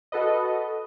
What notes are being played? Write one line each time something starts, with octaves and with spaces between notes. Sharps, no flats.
F#4 A4 B4 D#5